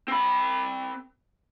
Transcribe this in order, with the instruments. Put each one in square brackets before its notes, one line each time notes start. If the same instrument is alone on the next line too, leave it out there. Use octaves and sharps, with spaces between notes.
[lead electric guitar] C4 B5